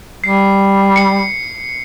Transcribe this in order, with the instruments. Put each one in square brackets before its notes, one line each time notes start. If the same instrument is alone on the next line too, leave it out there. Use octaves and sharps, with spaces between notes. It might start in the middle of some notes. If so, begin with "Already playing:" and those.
[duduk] G3 [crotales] C7
[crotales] C#7